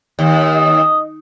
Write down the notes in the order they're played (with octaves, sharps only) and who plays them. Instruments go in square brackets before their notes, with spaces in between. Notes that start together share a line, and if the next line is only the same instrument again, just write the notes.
[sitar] D#2
[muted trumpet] D#5